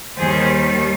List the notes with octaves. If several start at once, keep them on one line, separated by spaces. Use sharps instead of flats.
D#2 D#3 G3 G#4 C5